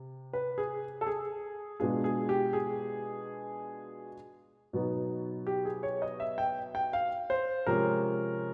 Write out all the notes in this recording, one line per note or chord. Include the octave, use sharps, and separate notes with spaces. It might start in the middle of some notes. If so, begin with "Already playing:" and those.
Already playing: C3
B4
G#4
A4
G#4
B2 G#3 B3 D4 F4 G#4
G#4
G4
G#4
B2 F#3 B3 D#4
G4
G#4
C#5
D#5
E5
G5
G5
F5
C5
C3 F3 G#3 C#4 A#4